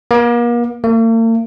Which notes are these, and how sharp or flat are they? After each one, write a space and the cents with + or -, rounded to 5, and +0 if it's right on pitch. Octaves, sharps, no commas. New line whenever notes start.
A#3 +40
A#3 -45